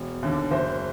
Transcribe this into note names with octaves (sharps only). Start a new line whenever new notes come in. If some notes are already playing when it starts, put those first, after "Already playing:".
Already playing: E1
D#2 D3
F#1 C5